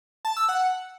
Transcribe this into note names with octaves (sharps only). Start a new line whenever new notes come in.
A5
E6
F#5